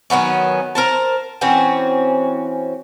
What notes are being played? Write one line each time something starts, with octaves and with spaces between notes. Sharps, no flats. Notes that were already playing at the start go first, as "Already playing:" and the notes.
D#3 F#3 B3 C#4
A#4 C5 A5
E3 C4 C#4 F#4